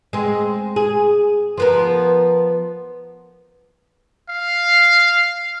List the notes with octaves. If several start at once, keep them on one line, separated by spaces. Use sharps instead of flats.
G#3 C4
G#4
F3 B3 A#4
F5